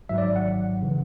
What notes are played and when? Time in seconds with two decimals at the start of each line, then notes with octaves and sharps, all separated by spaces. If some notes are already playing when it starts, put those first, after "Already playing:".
0.09 G#1 G#2 F#3 E5
0.18 D5
0.36 F#5
0.82 C#3 E3